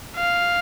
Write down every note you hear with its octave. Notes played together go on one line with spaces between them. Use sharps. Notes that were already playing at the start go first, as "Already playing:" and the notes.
F5